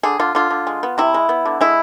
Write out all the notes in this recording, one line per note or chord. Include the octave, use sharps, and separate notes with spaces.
D3 G#4
D3 F4
D3 F4
D3
G#3
B3
C3 E4
G#3
B3
D3
G#3 E4